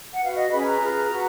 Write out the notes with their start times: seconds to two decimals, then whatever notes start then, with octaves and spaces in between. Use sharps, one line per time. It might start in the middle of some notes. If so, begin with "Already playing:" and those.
0.13 F#5
0.21 F#4 B4 F5
0.36 D#5
0.51 C#4 G#4 B4 B5
0.61 G#5
0.65 A#5
0.80 F4 G#4 B4
1.09 F#4 B4